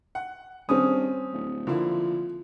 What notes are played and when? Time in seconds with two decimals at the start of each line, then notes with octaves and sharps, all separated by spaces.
0.15 F#5
0.69 G2 C4 C#4 D#6
1.33 D1
1.67 D3 F3 A#3 E4